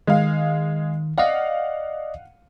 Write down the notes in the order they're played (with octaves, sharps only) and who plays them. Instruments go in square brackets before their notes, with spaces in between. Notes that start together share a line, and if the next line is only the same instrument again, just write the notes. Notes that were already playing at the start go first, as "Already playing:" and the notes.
[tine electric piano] D#3 [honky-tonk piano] G#3 F5
[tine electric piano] D5 D#5 [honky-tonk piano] F5 F#5